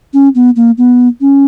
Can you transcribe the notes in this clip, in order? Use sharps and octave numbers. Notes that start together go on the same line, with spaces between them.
C#4
B3
A#3
B3
C#4